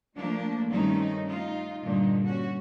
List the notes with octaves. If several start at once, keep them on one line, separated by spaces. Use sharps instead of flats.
F3 A3 A#3 D4
G2 D#3 A3 C4 C#4 D#4
D#4 F4
G2 A#2 D3 D#4
C#4 F#4